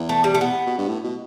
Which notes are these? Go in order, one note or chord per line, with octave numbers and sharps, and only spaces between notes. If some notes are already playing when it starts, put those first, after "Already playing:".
Already playing: E2
A3
G3
A3
B3
B2
G2
A2
B2